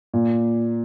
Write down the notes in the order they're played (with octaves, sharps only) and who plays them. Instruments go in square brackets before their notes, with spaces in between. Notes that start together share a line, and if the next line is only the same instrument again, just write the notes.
[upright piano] A#2